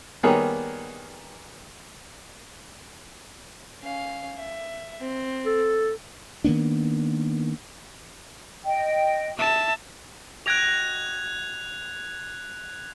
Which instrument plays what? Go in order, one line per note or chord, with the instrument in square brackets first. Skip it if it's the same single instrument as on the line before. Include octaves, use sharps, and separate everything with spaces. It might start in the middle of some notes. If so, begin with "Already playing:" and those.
[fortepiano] D#3 G3 A#3 B3 G#4 C#5
[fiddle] C#4 F5
E5
C4
[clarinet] A4
[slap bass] D#3 A#3 B3 D4
[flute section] D#5 G5
[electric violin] E5 A5
[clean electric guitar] F#4 D#5 G5 [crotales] F#6 G#6 F7